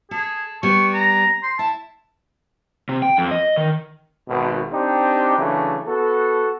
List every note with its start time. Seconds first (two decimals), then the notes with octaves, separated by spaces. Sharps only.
0.11 G#4 A4
0.63 G3 B3 C#6
0.93 A#5
1.43 C6
1.59 E4 A5
2.89 C3
3.02 G5
3.18 F2
3.31 D#5
3.57 D#3
4.28 G#1 B2
4.71 C4 D4 D#4 G4
5.38 C#3 E3 F#3 A3 D4
5.86 B3 F#4 A4